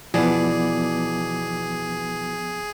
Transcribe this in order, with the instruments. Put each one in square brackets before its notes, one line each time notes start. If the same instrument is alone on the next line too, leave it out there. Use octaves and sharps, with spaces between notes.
[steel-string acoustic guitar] B2 E3 D5 [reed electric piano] F3 B3 [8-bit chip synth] G#4